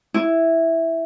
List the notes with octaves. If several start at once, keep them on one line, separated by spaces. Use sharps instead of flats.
E4